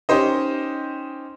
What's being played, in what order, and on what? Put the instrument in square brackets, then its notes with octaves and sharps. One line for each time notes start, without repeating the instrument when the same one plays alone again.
[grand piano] C#4 D#4 G4 C5 D#5